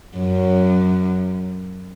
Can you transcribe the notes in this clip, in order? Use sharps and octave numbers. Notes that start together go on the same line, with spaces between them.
F#2